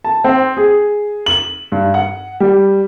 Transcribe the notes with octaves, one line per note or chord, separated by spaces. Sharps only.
A5
C4
G#4
F#7
G2
F#5
G3